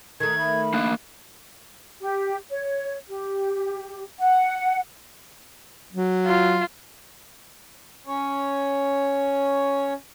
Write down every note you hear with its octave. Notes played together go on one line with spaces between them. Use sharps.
D#3 A3 A#5 G#6
B5
A#3 D4 F5 F#6
G4
C#5
G4
F#5
F#3
F4
C#4 C#5